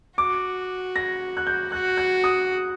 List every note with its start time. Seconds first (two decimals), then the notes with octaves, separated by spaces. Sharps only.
0.18 F#4 D6
0.96 A#6
1.37 F#6
1.47 G6
1.72 F#4 F#6
1.97 F#6
2.24 D#6